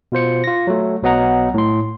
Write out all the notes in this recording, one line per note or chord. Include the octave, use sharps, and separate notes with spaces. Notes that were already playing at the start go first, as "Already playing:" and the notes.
B2 F4 C5 C#7
F4 A#6
F#3 A3
B1 F#3 B3 D#5 F#5 A#5
A2 C6